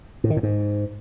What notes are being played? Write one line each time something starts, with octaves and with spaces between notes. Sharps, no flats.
A2
D#3
A2
G#2